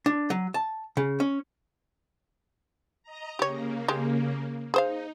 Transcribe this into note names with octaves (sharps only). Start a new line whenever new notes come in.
D4
F#3
A5
C#3
C#4
D#5 A#5
C#3 A#3 G4 C#5
G#3 G4
D#4 G#4 C5 F5